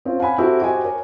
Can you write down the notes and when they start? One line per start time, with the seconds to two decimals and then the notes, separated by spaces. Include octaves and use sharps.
0.05 C4 C#4 F4
0.20 F5 F#5 G#5 B5
0.38 C4 E4 F#4 G4 A4
0.61 F#4 G4 C5 D#5 G5 G#5
0.84 A#4 C#5 G#5